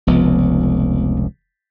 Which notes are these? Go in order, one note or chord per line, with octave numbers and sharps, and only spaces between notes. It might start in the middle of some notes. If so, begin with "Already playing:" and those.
F1 C#2 F3 B3